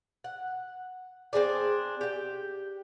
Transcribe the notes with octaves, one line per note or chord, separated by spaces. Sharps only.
F#5
C4 D4 G#4 D5
G4 G5